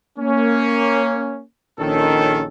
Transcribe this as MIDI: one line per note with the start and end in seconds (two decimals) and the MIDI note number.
0.18 1.40 58
0.18 1.40 61
1.78 2.45 34
1.78 2.45 51
1.78 2.45 61
1.78 2.45 69